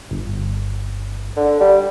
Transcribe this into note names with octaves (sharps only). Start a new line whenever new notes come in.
G1
D3
G3